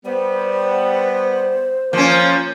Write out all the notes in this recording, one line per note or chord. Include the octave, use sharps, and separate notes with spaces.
G3 B3 C5
F3 A#3 C#4